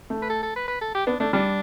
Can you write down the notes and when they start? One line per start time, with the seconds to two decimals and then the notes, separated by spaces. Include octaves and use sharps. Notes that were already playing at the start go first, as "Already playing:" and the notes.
0.10 A3
0.22 B4
0.30 A4
0.43 A4
0.56 B4
0.68 B4
0.81 A4
0.95 G4
1.07 B3 D4
1.20 A3 D4
1.33 G3 D4